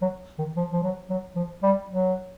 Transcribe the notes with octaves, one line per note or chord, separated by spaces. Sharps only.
F#3
D#3
F3
F3
F#3
F#3
F3
G3
F#3